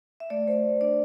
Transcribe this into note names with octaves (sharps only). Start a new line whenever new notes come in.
E5
A3 D5
A3 C5
A3
D4 D5